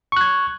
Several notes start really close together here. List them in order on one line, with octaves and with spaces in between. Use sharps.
C#6 F#6 G#6